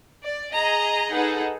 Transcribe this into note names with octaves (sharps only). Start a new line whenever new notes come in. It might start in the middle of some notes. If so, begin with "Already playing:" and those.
D5
G#4 D#5 A#5
D#4 G#4 A4 B4 F#5